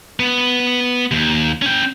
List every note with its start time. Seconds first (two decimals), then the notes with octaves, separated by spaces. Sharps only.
0.20 B3
1.11 D#2
1.62 C#4 G5